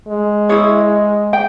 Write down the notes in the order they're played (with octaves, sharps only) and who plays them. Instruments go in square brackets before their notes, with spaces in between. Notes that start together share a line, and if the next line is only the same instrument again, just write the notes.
[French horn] G#3
[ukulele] E4 G#4 C#5
G5